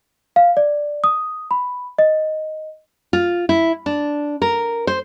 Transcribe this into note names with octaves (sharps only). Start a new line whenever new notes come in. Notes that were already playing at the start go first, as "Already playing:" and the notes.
F5
D5
D#6
B5
D#5
F4
E4
D4
A#4
C5